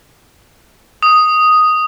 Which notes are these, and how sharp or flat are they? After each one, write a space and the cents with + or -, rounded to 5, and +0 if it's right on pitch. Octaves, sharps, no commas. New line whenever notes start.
D#6 +0